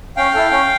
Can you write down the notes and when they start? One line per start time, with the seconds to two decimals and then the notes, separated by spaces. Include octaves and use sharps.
0.17 C#4 F5 G5
0.35 E4 A4
0.51 C#4